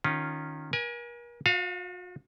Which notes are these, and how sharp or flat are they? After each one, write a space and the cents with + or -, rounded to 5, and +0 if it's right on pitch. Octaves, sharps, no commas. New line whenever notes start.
D#3 -15 C#4 +0 F4 +0
A#4 +40 G#5 +0
F#4 -45 F5 +0